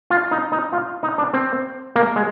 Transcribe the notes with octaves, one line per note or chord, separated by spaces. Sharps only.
F4
D#4
D#4
F4
D#4
D4
C4
A#3
G#3